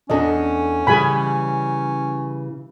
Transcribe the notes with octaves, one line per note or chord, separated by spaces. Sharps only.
E2 C#4 D4 A4 D#5
C#3 E3 G3 G#4 G#5 B5